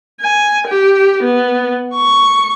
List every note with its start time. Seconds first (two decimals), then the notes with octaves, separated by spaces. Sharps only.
0.21 G#5
0.67 G4
1.23 B3
1.95 C#6